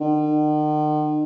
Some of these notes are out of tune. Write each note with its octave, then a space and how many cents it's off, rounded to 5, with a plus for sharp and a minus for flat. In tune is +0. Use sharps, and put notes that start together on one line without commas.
D#3 -45